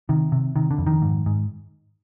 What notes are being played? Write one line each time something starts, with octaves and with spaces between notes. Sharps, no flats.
C3 D#3
C3
C3 D#3
D3
F2
D#3
G#2
G#2